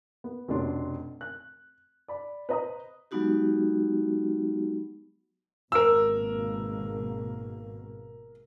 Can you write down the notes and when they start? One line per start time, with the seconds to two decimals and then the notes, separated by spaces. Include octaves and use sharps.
0.24 B3
0.48 F1 B2 A3 C#4 D4 C6
1.21 F#6
2.08 D5 B5
2.49 B4 C5 D#5 A#5 B5 D#6
3.11 F#3 G#3 B3 D#4 F#4 G4
5.72 G#1 B2 A#3 A#4 E6